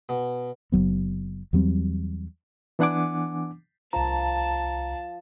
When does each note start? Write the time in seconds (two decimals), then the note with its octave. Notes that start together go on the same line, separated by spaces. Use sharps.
0.09 B2
0.72 F#1 D#2 F#3 B3
1.53 E2 F#3 G3 C4
2.79 E3 B3 D4 F#5 G#5 D6
3.93 C2 F3 A5 A#5